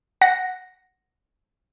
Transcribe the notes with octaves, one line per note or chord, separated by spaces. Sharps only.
F#5 A#6